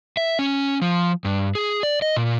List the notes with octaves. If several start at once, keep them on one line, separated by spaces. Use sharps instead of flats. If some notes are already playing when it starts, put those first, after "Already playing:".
E5
C#4
F3
G2
G#4
D5
D#5
A#2